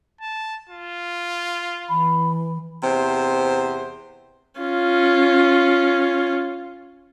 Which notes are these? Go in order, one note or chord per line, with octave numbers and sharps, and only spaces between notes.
A5
F4
E3 B5
E2 C3 C5
C#4 F4